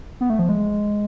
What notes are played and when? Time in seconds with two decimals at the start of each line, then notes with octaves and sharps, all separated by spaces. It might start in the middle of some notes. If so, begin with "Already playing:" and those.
0.21 B3
0.30 A3
0.39 F3
0.49 G#3